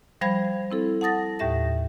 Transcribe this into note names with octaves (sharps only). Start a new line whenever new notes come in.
F3 G3 C5 F5 B5 G#6
C4 E4 A4
F#5 A5 D#6 A6 A#6
D#2 A2 G4 E5 A#6